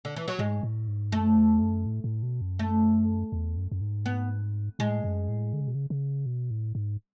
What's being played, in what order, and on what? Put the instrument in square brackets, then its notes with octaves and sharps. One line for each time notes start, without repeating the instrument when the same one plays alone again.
[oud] D3
E3
F#3
[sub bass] G#2 [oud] G#3
[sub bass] A2
G#2
[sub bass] F#2 [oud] A3
[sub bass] E2
F#2
A2
A2
B2
F#2
[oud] A3
[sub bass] E2
F#2
F#2
G#2
[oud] B3
[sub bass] A2 [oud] G#3
[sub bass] F#2
A2
D3
C#3
B2
C#3
C#3
B2
A2
G#2